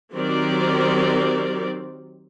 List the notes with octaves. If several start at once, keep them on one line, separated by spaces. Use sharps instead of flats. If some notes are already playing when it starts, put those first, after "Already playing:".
D#3 F#3 C4 G4 A#4 D5